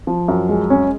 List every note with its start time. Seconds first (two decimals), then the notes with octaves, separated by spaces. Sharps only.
0.07 F3
0.28 F#2
0.49 G#3
0.70 C#4